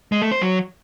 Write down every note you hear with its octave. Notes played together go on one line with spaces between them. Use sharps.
G#3
A3
C5
F#3